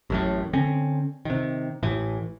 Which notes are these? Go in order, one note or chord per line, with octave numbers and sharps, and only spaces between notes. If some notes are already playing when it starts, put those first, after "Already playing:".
A1 F#2 A2
D3 C4 C#4
C3 D#3
A1 A2 E3